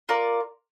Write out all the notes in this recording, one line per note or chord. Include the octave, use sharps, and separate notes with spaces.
F4 A#4 D5